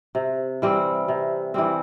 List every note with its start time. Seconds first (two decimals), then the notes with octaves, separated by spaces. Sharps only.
0.15 C3
0.62 E3 G3 C4
1.08 C3
1.54 E3 G3 C4